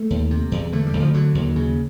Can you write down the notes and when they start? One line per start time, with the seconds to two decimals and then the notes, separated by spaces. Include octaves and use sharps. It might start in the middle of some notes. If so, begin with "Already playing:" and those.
Already playing: A3
0.10 D#2
0.31 C3
0.52 E2
0.72 D3 A3
0.86 G3
0.93 D2
1.00 F3
1.14 D3 F#3
1.35 D#2
1.56 C#3